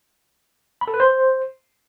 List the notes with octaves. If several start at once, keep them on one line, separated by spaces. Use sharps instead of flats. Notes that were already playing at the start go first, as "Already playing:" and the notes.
B5
A4
B4
C5